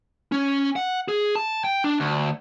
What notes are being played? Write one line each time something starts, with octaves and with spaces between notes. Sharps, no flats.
C#4
F#5
G#4
A5
G5
D4
D2